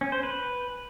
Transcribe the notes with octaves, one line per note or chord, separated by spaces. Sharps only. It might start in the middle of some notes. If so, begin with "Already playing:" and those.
C#4
C5
B4